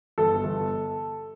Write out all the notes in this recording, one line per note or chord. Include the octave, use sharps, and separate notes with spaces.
G1 A4
G1